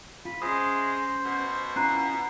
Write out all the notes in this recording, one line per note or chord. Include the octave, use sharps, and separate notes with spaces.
F4 B5
G#3 C#4 C5 E5 D#6
B2
C#4 E4 F4 A#5 F#6 C7